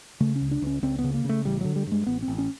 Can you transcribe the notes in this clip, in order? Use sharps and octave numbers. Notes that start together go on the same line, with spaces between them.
C#3 A3
C#4
C#2
D4
C#2 C#4
C#2 C4
B3
C#3
A#3
C#3 A3
A1 G3
D3 F#3
G3
G2 G#3
A1 B3
C4
A1
C#4